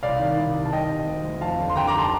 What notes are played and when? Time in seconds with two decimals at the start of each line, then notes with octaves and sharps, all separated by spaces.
0.03 C2 D5 F5
0.20 D#3
0.38 C2
0.55 C3
0.66 A5
0.72 D#3 D#5 G5
0.90 C3
1.07 D2
1.24 D2
1.41 F2 F5 A5
1.58 D3
1.70 C6
1.76 D3 G5 A#5
1.87 A#5 D6
1.99 A5 C6